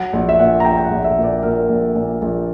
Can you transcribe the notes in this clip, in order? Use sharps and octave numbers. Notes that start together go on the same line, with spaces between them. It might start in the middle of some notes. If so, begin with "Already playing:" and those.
Already playing: F#3 F#5
A#1
E5
A#2 F#5
A#5
A#1 G5
G5
F#5
A#1
E5
A#2
D5
A#2 A#4
A#1
A#2
A#1